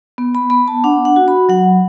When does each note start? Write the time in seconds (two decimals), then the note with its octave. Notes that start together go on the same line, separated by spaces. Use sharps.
0.18 B3
0.35 B5
0.50 B3 B5
0.68 A5
0.84 D4 F#5
1.05 F#5
1.16 F#4
1.28 B5
1.49 F#3 F#5